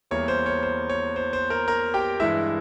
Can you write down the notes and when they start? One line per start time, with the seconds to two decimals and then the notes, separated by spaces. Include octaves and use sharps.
0.11 E2 E3 G3 A#3 C#5
0.28 C5
0.46 C#5
0.63 C5
0.90 C#5
1.16 C5
1.33 C5
1.50 A#4 A#5
1.68 A#4 A#5
1.94 G4 G5
2.20 G2 E3 G#3 E4 E5